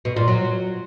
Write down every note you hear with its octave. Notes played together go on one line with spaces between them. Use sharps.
B2
A#2
F#3